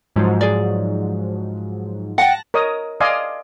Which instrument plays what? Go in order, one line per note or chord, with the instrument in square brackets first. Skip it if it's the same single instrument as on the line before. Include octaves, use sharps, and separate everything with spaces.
[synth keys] G#2 F3 F#3
[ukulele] G#4 D5
[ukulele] F#5 G5 [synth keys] A5 F#6 A#6
[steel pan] A#4 C#5 D#5 D#6
D5 D#5 F5 G#5 C6